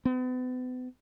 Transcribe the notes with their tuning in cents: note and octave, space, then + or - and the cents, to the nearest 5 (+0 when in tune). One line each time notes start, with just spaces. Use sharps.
B3 +40